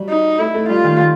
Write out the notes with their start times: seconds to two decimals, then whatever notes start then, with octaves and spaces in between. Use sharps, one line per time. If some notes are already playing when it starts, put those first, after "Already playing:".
Already playing: F#3 G3
0.09 D#4
0.39 A3 E4
0.54 A3
0.68 G3 F4
0.84 D#3
0.98 D#3